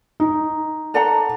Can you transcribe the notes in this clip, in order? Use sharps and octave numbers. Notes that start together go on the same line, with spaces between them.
D#4
A4 D5 F#5 A#5